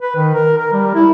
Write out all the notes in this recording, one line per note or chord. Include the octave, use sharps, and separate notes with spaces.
B4
D#3
A#4
A#4
G3
E4